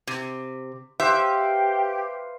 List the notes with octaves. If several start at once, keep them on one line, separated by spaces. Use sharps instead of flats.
C3
G4 B4 C5 E5 F5